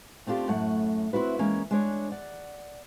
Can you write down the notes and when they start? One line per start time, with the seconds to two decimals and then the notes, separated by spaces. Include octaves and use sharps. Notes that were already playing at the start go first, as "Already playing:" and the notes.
0.27 A3 C4 D4 F4 G4
0.48 F#2 A2 A3 F#5
1.13 C4 E4 F#4 B4
1.39 E3 G#3 A#3 C#4
1.71 G#3 D4 C#5
2.12 D5 F#5